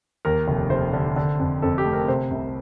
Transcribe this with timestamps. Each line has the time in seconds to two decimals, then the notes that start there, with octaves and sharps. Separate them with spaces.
0.25 D#2 A#4
0.47 F1
0.70 F1 C5
0.93 D3
1.16 D3
1.39 F2
1.62 F2 A4
1.78 G4
1.85 A3
1.93 A#4
2.08 C3 C5
2.31 C2